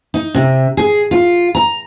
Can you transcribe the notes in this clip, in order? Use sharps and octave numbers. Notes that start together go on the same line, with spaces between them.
D#4
C3
G#4
F4
A#5